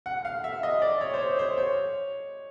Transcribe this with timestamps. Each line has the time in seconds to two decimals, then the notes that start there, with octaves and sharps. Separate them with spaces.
0.06 F#5
0.25 F5
0.44 E5
0.63 D#5
0.82 D5
1.01 C#5
1.14 C5
1.20 C#5
1.39 C5
1.58 C#5